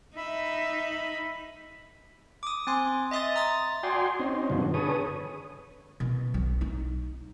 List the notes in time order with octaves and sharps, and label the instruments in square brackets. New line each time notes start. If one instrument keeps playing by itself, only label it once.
[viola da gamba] D#4 [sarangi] E5 [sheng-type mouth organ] B5
[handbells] D6 D#6
C4 G#5 C6
D#5 E5 C6 D#6 A6
A#5 D#6 A6
[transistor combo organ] F#4 D5 G5 G#5 C6
C4 C#4 D#4
G2 B2 D3 D#3 F3 F#3
D3 G#4 A4 B4 C#5 D#6
[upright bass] B2
B1
D#4